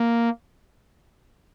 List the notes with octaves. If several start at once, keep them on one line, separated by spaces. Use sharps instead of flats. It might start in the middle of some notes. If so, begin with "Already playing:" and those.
Already playing: A#3